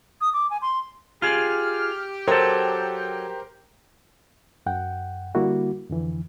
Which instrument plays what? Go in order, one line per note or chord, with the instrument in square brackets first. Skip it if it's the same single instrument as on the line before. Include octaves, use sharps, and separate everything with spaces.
[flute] D#6
D6
G#5
C6
[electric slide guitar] F4 G#4 [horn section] G4 [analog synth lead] F6
[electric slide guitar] F#3 A4 [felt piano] A#4 C5 [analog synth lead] G5
[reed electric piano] F#2 F#5 G5
D3 G3 A#3 E4 F#4
F2 D3 E3